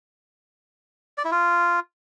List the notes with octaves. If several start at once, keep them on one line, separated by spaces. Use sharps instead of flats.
D5
E4
F4